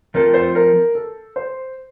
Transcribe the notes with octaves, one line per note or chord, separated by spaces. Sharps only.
F3 A3 C4 F4 A4 A#4
C5
A#4
A4
C5